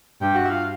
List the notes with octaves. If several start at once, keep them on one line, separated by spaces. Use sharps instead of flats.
G2 G4 G5
F#4 F#5
E5
F4 F5